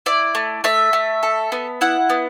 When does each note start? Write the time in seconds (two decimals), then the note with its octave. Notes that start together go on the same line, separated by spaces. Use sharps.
0.06 E4 D5
0.35 A3
0.64 A3 E5
0.93 A3
1.23 A4
1.52 B3
1.81 E4 F#5
2.10 B3